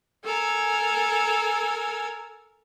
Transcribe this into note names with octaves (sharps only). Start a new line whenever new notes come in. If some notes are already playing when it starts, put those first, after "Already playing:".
A4 A#4 G#5